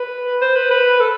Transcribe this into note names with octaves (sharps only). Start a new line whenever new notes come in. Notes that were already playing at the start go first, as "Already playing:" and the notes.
Already playing: B4
C5
B4
B4
A4